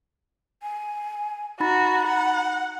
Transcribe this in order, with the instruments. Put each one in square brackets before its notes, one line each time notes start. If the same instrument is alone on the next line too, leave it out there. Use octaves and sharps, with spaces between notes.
[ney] G#5
[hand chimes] D#4 B5 A6 [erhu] F#4 [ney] A#5
[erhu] F#5